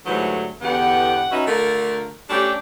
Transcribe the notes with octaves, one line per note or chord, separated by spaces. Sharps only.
G#2 D3 E3 F#3 G3 A3
E2 D3 E3 B3 G4 F#5
C#4 D#4 F#4 B4 D#5 E5
D3 A3 F4 A#4
G3 A3 C#4 D4 G4